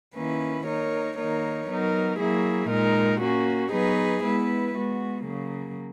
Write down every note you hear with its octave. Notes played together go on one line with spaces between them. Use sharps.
D#3 A#3 C#4 E4 B4
A#3 D#4 A#4 C#5
D#3 A#3 D#4 A#4 C#5
F#3 B3 D#4 A#4
F#3 A#3 E4 G#4
A#2 G#3 D#4 A#4
A#3 C#4 F#4
F#3 B3 D#4 G#4 B4
G#3 B3 E4 B4
G#3 B3 F#4
C#3 F#3 A#3